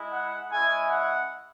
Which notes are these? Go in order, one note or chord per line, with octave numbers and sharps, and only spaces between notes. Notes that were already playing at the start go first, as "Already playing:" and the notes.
Already playing: G#3 E4
F#5
G#3 C#4 E4 G#5
F#5